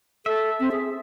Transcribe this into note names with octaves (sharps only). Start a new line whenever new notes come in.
A4 E5
C4
G#4